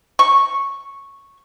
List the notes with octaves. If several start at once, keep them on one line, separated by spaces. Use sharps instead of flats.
C#6